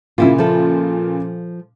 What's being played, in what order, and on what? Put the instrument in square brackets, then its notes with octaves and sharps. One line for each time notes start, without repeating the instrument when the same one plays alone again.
[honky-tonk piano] A#2 C#3 [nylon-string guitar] A#3 E4 F4
[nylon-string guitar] F3 A4